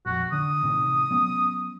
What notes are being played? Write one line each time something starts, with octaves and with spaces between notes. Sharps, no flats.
A#1 F2 F#4
D3 D4 D#6
A1 C3 D#3
F#3 B3 C#4